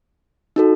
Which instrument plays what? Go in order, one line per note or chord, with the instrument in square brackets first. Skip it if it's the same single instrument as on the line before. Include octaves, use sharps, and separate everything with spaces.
[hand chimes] D#4 F#4 A4